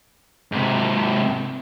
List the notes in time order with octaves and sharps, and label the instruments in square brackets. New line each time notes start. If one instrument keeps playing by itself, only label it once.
[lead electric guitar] G#2 C3